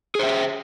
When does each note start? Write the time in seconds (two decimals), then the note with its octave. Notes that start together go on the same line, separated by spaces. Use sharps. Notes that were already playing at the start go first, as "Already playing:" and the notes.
0.15 G#4
0.19 C5
0.23 E5